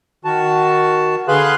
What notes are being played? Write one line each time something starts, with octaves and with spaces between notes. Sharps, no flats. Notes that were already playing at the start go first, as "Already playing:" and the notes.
D#3 F#4 A5
D3 G#4 B4 F5 C6 F#6